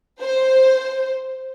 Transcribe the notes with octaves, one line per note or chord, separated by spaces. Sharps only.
C5